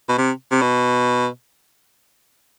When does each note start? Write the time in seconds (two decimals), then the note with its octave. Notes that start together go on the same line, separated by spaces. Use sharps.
0.09 B2
0.18 C3
0.52 C3
0.61 B2